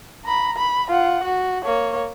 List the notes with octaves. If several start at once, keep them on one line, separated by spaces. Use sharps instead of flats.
A#5 B5
B5
F4 F#5
F#4
A#3 C#5